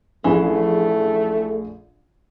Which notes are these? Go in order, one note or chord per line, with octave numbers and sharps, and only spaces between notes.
A#1 E3 A3 C#4 G#4